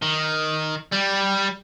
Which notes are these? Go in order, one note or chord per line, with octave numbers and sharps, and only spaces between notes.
D#3
G3